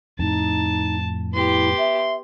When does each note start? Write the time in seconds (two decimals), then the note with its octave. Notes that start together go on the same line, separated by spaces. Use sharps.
0.19 F2 A2 D#4 A5
1.33 B3 E4 G4 C6
1.78 E5